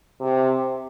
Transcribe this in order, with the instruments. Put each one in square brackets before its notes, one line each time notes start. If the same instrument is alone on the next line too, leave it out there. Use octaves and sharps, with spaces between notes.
[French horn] C3